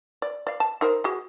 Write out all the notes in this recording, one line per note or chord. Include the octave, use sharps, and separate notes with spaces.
D5
D5 F5
A5
D#4 A#4 C5
F#4 G#4